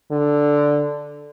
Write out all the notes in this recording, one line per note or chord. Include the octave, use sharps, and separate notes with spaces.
D3